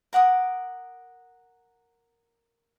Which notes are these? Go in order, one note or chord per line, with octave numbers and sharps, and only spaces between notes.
A#4 F#5 D6 D#6